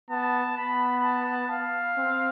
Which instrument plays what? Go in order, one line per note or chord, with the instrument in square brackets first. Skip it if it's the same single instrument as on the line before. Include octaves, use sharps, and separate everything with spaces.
[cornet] B3 [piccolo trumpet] A5
[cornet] B3 [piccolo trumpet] B5
[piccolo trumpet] A5
F5
[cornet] C4